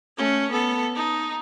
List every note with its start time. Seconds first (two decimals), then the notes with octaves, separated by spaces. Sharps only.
0.17 A3 C#4
0.51 B3 A4
0.95 D#4